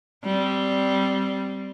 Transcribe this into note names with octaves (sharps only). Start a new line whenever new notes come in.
G3 C4